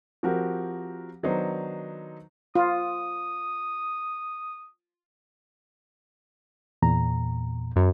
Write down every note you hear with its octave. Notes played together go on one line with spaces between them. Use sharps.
F3 C4 F#4 G4 A#4
D#3 F#3 B3 D4 D#4 C5
F4 D#6
E2 A#2 A#5
F#2